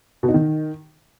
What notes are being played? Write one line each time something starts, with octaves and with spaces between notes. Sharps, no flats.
B2
D#4
D#3